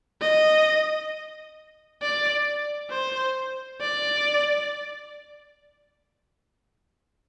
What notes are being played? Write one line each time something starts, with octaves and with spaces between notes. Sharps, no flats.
D#5
D5
C5
D5